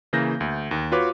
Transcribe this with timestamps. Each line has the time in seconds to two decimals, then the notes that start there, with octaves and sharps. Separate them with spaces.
0.13 C#3 E3 A#3 G6 A#6
0.40 D2
0.71 D#2
0.92 F4 F#4 B4 C#5 D6